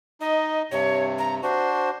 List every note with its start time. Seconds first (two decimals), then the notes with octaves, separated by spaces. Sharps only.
0.21 D#4 D#5
0.72 G2 C3 C#5
1.18 A#5
1.42 D4 F#4 C5